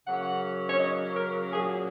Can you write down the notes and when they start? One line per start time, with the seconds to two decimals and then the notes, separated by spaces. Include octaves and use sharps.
0.06 C#3 F#3 A#3 C#4 F#5
0.23 F#5
0.68 C#5
0.79 D#5
1.16 A#4
1.53 A#2 F#3 A#3 C#4 G#4